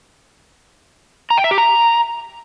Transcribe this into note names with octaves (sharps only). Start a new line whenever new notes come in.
A#5
G5
E5
G4
A#5